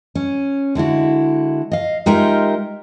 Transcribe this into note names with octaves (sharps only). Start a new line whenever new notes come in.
C#4
D3 G#3 E4 F#4
D#5 F5
G#3 D#4 F4 G4 A#4 E5